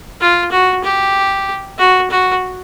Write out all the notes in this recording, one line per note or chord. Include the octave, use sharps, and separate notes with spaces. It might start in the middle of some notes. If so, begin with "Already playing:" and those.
F4
F#4
G4
F#4
F#4